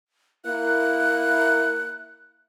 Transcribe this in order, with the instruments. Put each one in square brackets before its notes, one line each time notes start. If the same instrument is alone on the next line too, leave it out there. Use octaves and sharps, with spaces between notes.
[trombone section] A#3 E4 [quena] F#6